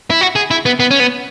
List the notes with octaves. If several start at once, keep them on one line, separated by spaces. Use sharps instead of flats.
E4
F#4
G#4
E4
B3
B3
C#4
B3